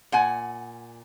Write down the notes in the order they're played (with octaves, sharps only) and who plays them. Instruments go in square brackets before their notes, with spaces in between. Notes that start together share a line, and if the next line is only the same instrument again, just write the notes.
[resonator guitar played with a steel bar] A#2 F#5 G#5